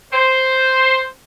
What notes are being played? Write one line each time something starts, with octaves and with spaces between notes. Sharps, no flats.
C5